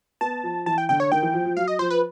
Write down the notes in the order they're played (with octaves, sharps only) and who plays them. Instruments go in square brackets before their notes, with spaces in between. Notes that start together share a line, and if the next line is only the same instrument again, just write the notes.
[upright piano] B3 [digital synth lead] A5
[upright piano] F3
[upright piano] E3 [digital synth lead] A5
[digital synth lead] G5
[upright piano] D3 [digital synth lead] G5
[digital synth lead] C#5
[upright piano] D#3 [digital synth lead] G5
[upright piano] E3
F3
F3
[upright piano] F#3 [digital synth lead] F5
[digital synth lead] D#5
[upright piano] F3 [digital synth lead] C5
[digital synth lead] B4